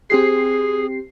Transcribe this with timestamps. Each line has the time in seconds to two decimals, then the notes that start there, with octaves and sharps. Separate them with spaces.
0.10 C4 G4 G#4 C7